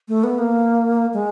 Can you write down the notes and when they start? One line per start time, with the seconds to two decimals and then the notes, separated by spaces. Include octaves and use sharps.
0.08 A3
0.24 B3
0.39 A#3
1.14 G#3